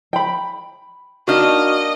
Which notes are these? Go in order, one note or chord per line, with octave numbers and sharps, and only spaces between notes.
G5 B5
A#3 D4 D#4 F#4 D#5 F6